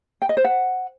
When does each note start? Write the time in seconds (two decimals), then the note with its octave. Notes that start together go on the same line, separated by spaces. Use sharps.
0.22 G5
0.29 D#5
0.37 C5
0.44 F#5